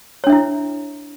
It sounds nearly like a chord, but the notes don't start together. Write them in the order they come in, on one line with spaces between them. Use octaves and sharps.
C#5 D4 E5 E4